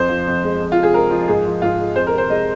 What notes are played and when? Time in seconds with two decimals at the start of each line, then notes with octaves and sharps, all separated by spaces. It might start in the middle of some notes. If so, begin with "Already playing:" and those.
Already playing: F2 C5
0.09 F3
0.27 F2
0.44 G#3
0.60 F2
0.72 F4
0.78 C3
0.83 G#4
0.94 G#3 A#4
1.11 F3
1.28 G#2 G#4
1.46 F3
1.62 G#2 F4
1.79 G#3
1.96 F2 C5
2.07 A#4
2.13 C3
2.18 C5
2.30 G#3 D#5